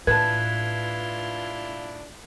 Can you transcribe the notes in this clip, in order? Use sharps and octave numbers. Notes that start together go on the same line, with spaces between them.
A2 D4 E4 F4 B4 A5 G#6